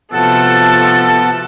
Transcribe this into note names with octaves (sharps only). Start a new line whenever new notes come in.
C3 F3 A3 B3 F#4 A4 F#5 A5